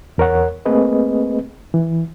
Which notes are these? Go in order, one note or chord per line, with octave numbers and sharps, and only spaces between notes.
E2 A#4 C#5 F#5
A3 A#3 C4 G#4 B4 D#5
E3